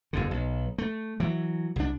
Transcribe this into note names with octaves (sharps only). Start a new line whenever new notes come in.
F#1 F2 D3
B1
A3
E3 F#3
C2 D4